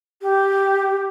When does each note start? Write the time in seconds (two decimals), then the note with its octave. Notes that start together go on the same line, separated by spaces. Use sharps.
0.22 G4